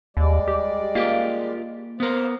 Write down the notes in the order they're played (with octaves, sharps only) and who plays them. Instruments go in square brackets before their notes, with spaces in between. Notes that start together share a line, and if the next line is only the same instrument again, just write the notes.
[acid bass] D#2 [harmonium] G3 G#3 D5
[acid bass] G4
[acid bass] A#3 [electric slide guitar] F4 G4 A#4
[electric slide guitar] B3 A#4 [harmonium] C5 F5